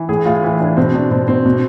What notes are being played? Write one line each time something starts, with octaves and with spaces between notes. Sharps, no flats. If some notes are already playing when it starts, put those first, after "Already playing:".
Already playing: E3
A2 G#4
A2 F4
E3 E4
E3 D4
B2 C4
B2 D4
B2 C4
B2 C4
B2